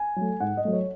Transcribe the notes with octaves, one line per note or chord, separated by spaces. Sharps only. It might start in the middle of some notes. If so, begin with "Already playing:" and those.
Already playing: G#5
F#3 A3
G#2 F#5
D#5
F#3 A3
C#5